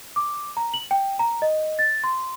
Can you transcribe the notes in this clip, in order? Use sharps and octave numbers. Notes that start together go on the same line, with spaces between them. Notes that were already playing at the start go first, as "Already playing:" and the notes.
D6
A#5
F#7
G5
A#5
D#5
A6
C6